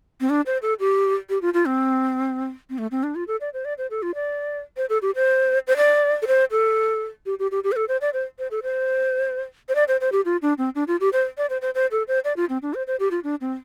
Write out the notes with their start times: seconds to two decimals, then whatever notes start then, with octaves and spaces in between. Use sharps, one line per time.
0.21 C4
0.30 D4
0.46 C5
0.62 A4
0.80 G4
1.30 G4
1.42 F4
1.54 F4
1.66 C4
2.70 C4
2.78 A3
2.91 C4
3.03 D4
3.15 F4
3.28 A4
3.41 D5
3.54 C5
3.65 D5
3.78 C5
3.90 A4
4.02 F4
4.15 D5
4.77 C5
4.89 A4
5.02 G4
5.15 C5
5.67 C5
5.77 D5
6.22 A4
6.27 C5
6.51 A4
7.26 G4
7.39 G4
7.51 G4
7.64 G4
7.72 C5
7.76 A4
7.88 C5
8.01 D5
8.13 C5
8.39 C5
8.51 A4
8.63 C5
9.69 C5
9.75 D5
9.88 C5
10.01 C5
10.12 G4
10.25 F4
10.42 D4
10.58 C4
10.75 D4
10.88 F4
11.00 G4
11.13 C5
11.38 D5
11.50 C5
11.62 C5
11.75 C5
11.91 A4
12.08 C5
12.24 D5
12.37 F4
12.49 C4
12.62 D4
12.74 C5
12.87 C5
13.00 G4
13.11 F4
13.24 D4
13.41 C4